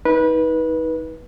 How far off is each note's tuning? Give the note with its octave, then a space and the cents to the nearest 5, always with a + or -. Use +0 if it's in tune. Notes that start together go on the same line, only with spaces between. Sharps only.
D#4 +35 B4 -20